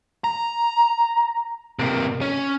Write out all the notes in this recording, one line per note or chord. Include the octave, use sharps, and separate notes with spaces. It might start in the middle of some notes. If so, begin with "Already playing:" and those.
A#5
C3 A#3
C#4